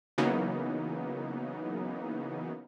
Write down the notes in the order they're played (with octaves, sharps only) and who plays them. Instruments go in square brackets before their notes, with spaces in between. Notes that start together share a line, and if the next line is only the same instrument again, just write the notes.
[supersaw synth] C#3 E3 F#3 A#3 B3 D#4